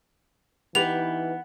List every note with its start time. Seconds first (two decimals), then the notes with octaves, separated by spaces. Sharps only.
0.75 E3 B3 D#4 G4 B4 F7